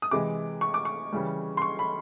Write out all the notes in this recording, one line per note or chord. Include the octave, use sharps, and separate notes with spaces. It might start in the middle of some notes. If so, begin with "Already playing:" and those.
D#6
C3 E3 G#3 D6
C#6
D6
C#6
C#3 E3 G3
C6
C#6
B5